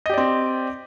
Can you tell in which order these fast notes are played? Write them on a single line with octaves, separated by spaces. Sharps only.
D#5 G4 D5 C4